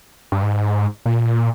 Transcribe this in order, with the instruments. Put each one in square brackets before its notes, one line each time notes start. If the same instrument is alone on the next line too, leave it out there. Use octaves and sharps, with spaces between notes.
[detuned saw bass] G2
G#2
A#2